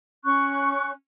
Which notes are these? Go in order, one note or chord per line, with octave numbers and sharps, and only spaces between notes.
C#4 C#6 F#6